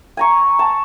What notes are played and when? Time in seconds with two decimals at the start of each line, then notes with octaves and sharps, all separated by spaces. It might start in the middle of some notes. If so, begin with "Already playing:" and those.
0.17 G#5 A#5 C#6
0.59 A5